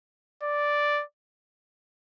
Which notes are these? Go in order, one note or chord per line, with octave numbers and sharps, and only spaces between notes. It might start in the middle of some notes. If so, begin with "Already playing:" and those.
D5